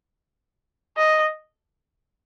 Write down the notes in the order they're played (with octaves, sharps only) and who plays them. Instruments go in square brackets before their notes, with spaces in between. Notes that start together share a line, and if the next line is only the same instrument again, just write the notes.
[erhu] D#5